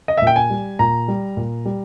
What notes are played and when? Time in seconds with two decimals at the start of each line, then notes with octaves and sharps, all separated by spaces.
0.08 D#5
0.17 E5
0.22 A#2
0.27 G5
0.36 G#5
0.50 G3
0.79 A#2 A#5
1.08 G3
1.37 A#2
1.65 G3